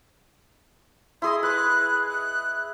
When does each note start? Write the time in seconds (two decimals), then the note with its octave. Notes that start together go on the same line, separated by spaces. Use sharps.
1.22 E4 G#4 D#5 C6
1.43 B4 F#6
2.10 F#6